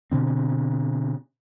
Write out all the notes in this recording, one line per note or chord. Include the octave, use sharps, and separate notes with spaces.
B2 D3 C4